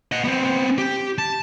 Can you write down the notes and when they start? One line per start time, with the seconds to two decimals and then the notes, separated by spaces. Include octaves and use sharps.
0.12 D#5 F#5
0.24 B3 C4
0.78 G4
1.18 A5